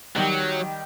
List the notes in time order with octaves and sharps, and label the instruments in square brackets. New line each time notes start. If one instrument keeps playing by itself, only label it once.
[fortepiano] D#3 G3 [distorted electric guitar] F#3